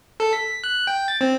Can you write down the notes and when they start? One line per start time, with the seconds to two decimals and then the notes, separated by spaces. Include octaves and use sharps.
0.20 A4
0.33 B6
0.64 F#6
0.87 G5
1.08 A6
1.21 C4